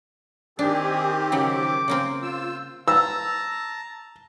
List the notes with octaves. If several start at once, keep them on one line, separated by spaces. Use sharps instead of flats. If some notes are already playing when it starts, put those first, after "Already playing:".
D#3 C4 D4 G4 G#4
C#3 F#3 D6
C#3 A#3 C4
F4 C5 E6
A5 A#5 E6